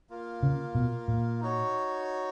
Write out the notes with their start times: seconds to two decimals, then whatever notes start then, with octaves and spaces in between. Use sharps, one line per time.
0.10 A#3 F4 A#4
0.43 C#3
0.75 B2
1.08 A#2
1.41 D#4 F#4 C#5